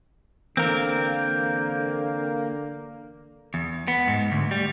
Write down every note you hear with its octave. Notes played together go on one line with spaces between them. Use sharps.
D3 E3 A#3 C4 A#4
E2
B3
G#2
D2
G3